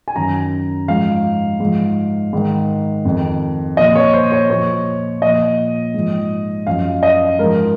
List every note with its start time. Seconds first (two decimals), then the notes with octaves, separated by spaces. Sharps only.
0.08 G#5
0.16 F#2 D#3 A#5
0.88 G#2 F3 F5
1.60 G#2
1.65 F3
2.33 G#2 D#3
3.05 F2 D#3
3.77 A#2 F3 D#5
3.96 C#5
4.14 C5
4.32 C#5
4.50 A#2 F3 C#5
5.22 A#2 F3 D#5
5.94 G#2 F3
6.67 F#2 F3 F5
7.03 D#5
7.39 G#2 F3 A#4